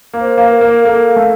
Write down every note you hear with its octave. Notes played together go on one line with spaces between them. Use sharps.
A#3
C5
A#3
C5
A#4
A#3
A#3 A4
A3